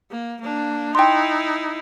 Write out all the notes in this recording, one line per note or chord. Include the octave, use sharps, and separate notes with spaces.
A#3
A#3 D4
D#4 E4 G5 C6